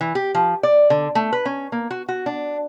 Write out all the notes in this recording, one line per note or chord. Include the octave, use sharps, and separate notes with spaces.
E3
G4
F3
D5
D3
A3
B4
C#4
A#3
F#4
F#4
D4